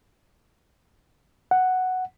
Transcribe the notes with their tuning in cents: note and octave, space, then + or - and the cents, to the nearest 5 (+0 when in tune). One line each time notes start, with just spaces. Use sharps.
F#5 +0